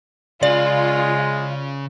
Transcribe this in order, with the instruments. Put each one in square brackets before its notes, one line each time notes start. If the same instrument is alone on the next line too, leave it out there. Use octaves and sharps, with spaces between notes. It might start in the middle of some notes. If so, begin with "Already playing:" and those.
[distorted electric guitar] C#3 [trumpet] G#3 [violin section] F4 [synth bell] D5